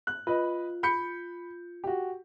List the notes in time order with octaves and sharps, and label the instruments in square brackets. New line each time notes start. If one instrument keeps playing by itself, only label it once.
[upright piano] F#6
[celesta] F4 [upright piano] B4 D#5
[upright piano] B5 G6 C#7
F#4 G4